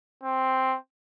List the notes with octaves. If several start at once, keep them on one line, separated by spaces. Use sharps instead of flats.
C4